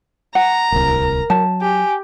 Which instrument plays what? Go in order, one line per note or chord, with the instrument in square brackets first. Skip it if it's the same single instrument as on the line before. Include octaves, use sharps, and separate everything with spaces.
[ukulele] F#5 [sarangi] A#5
[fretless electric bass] D1 C2 [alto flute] A#4
[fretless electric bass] F#3 [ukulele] A5
[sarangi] G4 [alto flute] G#5